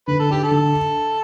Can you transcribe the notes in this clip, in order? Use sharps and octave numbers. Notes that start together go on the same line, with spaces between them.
D3 B4
A4
D4 G4
A4
D3